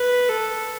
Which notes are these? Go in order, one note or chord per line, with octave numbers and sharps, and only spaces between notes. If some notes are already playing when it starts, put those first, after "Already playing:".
Already playing: B4
A4